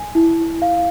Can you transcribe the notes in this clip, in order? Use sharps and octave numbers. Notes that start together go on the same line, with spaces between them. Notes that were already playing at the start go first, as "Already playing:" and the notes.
Already playing: G#5
E4
F5